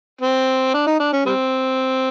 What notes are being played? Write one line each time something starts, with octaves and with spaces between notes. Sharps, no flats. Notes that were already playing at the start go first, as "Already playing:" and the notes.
C4
D4
D#4
D4
C#4
G3 C4